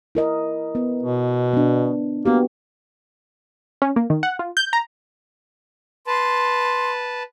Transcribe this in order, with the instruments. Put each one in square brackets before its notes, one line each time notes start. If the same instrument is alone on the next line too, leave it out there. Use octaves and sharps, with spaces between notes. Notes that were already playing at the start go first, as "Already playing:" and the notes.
[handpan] E4 A#4 D#5
B3
[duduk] B2
[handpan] B3 D4
[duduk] A#3 [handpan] B3 F#4 G4
[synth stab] C#4
A#3
D#3
F#5
F4
G6
A#5
[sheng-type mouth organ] B4 A5 [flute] C6